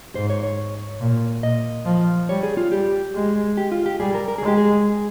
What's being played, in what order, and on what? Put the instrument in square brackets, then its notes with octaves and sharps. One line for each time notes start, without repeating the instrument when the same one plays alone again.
[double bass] G#2 [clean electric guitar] C5
[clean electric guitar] C#5
C#5
[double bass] A#2
[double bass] A#2 [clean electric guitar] D#5
[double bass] F3
[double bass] G3 [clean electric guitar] C#5
[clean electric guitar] G#4
F4
[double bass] G3 [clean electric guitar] G4
[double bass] G#3
[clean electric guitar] G4
F4
G4
[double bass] G3 [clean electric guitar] G#4
[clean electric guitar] A#4
A#4
G#4
[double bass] G#3
[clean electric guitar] G4
G#4